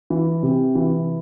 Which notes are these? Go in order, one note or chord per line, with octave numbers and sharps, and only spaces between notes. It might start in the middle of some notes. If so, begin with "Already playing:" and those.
E3
C3
E3